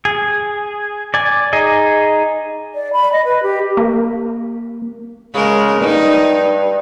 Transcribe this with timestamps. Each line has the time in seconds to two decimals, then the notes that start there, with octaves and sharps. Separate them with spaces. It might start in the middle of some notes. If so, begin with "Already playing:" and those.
0.05 G#4
1.14 D5 G#5
1.53 D#4 G#4 D#5
2.75 D5
2.93 B5
3.13 D#5
3.25 B4
3.43 G4
3.77 A#3
5.35 C#3 G#3 A#4
5.81 G2 D#4